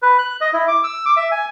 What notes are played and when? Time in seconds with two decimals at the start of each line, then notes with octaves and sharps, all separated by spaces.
0.02 B4
0.18 F#6
0.41 D#5
0.53 E4
0.68 D6
0.84 E6
1.06 D6
1.17 E5
1.31 G#5